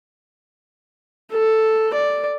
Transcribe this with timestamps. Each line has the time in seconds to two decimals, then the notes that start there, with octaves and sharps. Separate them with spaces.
1.33 A4
1.94 D5